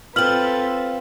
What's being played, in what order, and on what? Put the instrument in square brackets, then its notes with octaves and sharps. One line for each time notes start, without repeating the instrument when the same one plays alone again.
[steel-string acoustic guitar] C4 F4 [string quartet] A4 B4 [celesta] F6 F#7